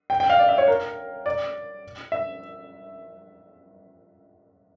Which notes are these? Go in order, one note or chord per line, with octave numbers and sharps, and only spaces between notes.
G5
G5
F5
D5
E5
C#5
A#4
D5
E5